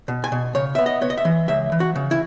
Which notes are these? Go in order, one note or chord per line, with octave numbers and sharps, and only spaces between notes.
B2
G#5
B2
C#3 C#5
B3 E5
D#5
B3 C#5
D#5
E5
E3
C#2 E5
E3
F#4
C#3
E4